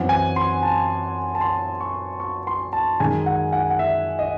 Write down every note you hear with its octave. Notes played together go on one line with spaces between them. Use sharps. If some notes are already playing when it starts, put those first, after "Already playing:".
Already playing: F#2 E3 C4 F#5
G#5
C6
A5
A5
C6
C#6
C#6
C6
A5
F#2 D#3 G#3 D#4 G#5
F#5
F#5
F#5
E5
D#5